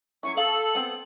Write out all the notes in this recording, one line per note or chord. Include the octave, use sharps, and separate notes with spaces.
F#3 C#4 E4 C#6
G#4 A4 F5 F#7
B3 C4